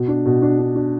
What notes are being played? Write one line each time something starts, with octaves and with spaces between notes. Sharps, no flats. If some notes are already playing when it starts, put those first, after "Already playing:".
Already playing: B2
D4
B2
D4
D4
D4